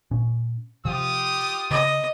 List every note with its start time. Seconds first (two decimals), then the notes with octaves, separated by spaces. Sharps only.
0.11 A#2 C#4
0.85 C3 F3 F4 G4 D#6
1.71 C#3 D#5